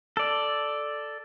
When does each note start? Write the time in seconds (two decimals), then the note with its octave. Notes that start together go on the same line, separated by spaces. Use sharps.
0.17 A4 D5